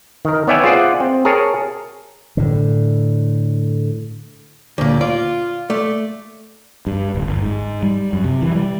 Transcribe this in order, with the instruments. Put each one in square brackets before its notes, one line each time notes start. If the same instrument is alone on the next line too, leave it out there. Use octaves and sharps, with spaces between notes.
[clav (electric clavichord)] D#3 A#4
B3 C#5 D5 E5 G5 G#5
F4 G#4 C5 D5 F#5
C4
G#4 A#4 C#5 A5
[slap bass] A2 D3
[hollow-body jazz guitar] D2 A#2 [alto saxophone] D5
[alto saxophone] F4 [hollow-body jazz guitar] D5
[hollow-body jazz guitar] A3 [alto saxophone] D5
[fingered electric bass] G2
D1
G1
G#2
G3
F#2
C3
E3
G3